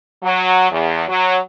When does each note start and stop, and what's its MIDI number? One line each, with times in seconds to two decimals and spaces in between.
0.23 0.67 54
0.71 1.07 40
1.08 1.38 54